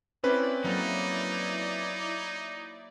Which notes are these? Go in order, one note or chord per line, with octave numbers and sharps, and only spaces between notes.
C4 C#4 E4 B4 D5
F#3 A#3 D#4 A4